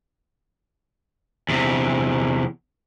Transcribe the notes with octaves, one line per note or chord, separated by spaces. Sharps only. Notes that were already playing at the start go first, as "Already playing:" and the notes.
E2 C3